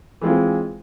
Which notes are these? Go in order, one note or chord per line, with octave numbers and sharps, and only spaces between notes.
E3 G#3 C4 F4